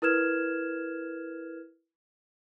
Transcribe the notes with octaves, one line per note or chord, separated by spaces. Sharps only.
E4 A#4 B4 F6 G#6 E7